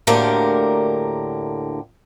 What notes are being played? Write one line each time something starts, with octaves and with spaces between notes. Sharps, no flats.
D2 A2 D3 A#3 G4 A#4